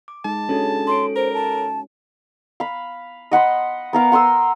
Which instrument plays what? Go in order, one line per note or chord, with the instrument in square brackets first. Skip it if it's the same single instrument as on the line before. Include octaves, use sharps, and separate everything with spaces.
[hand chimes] D6
[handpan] G#3 D#4 [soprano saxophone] A5
[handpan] C#4 F#4 [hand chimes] D4 G#4 A4
[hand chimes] A4 C#5 D7 [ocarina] C6
[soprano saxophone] A#4 [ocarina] C5
[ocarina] A5
[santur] F5 B5
D#5 F#5 B5 C6
B3 A#4 F5 D6
F#5 C6 D#6 E6